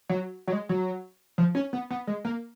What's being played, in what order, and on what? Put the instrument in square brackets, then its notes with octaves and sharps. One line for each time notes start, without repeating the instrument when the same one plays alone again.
[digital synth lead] F#3
F#3
G#3
F#3
F3
C#4
B3
B3
G#3
A#3